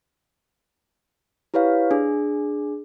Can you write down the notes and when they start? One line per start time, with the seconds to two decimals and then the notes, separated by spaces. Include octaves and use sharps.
1.54 E4 G4 B4 C#5 F5
1.91 D4 G#4